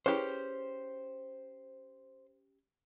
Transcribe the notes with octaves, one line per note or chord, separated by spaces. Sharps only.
C#4 E4 G4 G#4 B4 C5